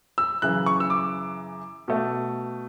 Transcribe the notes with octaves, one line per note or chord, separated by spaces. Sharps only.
E6
F#2 C#3 E3 F#6
C#6
E6
D6
B2 A3